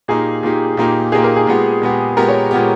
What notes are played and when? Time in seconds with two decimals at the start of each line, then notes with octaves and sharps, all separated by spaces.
0.08 A#2 A#3 D#4 G4 G#4
0.43 A#2 A#3 D#4 G4
0.77 A#2 A#3 D#4 G4
1.12 A#2 A#3 D#4 G4 G#4
1.24 A#4
1.36 G#4
1.47 A#2 G#3 B3 G4
1.82 A#2 G#3 B3 G4
2.17 A#2 G#3 B3 G4 A#4
2.28 C#5
2.51 A#2 G#3 B3 G4